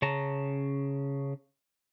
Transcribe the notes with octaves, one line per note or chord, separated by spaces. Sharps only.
C#3 C#4 A5 A#5